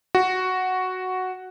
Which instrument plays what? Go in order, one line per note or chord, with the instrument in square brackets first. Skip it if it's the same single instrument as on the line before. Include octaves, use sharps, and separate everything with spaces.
[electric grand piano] F#4